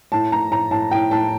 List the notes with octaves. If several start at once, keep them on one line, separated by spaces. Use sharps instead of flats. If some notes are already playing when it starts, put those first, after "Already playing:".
A2 A5
A2 A#5
A2 A#5
A2 A5
A2 G5
A2 A5